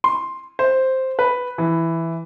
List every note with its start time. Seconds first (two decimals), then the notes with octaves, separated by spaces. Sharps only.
0.04 C6
0.59 C5
1.19 B4
1.58 E3